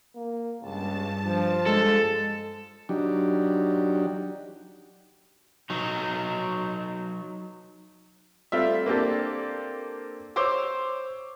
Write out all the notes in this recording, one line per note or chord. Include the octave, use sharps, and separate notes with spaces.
A#3
C#2 G2 A5
F3
G#3 A4
F#3 D4 D#4 G4
F#3 D#4
G3 A3 C4 F4 E5
A#3 C4 D4 G4 A4
C5 C#5 C6 D6 E6